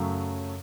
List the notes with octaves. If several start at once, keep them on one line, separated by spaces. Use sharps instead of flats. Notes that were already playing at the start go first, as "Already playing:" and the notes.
Already playing: F#2 C#3 F#3 A3